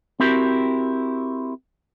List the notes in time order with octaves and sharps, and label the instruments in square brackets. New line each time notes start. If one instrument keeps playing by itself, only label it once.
[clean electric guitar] C4 E4 F#4 G4 A#4